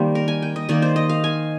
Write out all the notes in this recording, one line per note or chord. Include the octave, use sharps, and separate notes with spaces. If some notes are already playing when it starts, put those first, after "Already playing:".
Already playing: D#3 G3 A#3 C5
A#4
G#5
G5
D#5
D#3 A#3 D5
C5
D#5
F5
G#5